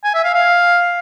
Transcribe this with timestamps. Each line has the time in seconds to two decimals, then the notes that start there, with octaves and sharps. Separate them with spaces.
0.04 G#5
0.14 E5
0.24 F5
0.34 F5